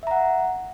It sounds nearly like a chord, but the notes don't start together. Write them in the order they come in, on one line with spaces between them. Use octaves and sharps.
E5 A#5 F#5